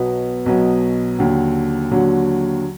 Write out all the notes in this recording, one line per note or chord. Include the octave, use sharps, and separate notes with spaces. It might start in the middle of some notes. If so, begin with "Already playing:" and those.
Already playing: B1 B2 F#3 B3
B1 B2 F#3 B3
D#2 D3 F#3
D#2 D3 F#3